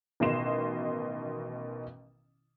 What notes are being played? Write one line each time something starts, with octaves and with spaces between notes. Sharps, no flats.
A1 B2 D#3 D#5 C6 E7